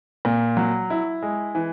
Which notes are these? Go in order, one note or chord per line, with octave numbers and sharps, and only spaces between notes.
A#2
F#3
E4
G#3
E3